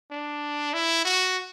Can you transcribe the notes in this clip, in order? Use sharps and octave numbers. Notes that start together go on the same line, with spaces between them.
D4
E4
F#4